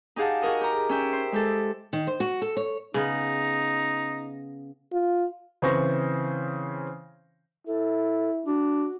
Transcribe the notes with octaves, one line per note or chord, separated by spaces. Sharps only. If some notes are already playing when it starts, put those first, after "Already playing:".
D#4 G4 G#4 F5 F#5 A5
F#4 G#4 A#4 D#5
G4 A#5
C#4 E5 G5
C5
G#3 G4 A4
D#3
C5
F#4
A4
C#5
C#3 B3 D#4
F4
C#3 E3 C4 C5 C#6 A#6
E4 A4
D4 F#4